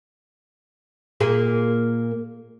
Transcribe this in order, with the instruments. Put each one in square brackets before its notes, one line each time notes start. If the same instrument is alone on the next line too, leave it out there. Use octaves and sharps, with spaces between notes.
[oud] A#2 A#3 G#4